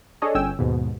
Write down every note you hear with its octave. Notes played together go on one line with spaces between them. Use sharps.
D4 G#4 A4 C#5 D#5
G1 C#4 G5 G#5 E6
D#2 G#2 B2